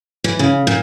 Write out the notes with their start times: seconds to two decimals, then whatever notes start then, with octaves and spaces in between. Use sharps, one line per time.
0.24 E3
0.39 C#3
0.67 A#2